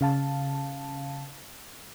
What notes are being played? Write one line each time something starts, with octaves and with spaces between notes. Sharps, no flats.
C#3 F5 A5